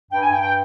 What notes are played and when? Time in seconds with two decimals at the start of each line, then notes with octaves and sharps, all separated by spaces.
0.11 G2 G5
0.21 G#5
0.32 G2 G5
0.42 G5